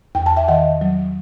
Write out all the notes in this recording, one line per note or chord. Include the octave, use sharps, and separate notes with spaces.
E2 G5
A5
E5 G5
D#3 D#5 F#5
F#3